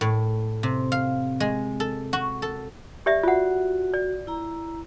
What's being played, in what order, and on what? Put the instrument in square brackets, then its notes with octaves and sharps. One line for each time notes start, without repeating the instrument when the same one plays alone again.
[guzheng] A2
C3
F5
G#3
A4
F#4
A4
[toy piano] G4 D5 E5
[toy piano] F4 F#5 [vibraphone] F#4
[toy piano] D5
[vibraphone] E4 A#5